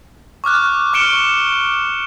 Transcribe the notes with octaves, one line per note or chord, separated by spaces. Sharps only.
C#6 D6 F6 F#6
C#6 F6 C#7 D7 E7 G7